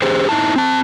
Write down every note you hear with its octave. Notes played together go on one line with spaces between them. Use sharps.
G4 G#4 C5
D#4 E4 A5
C4 A5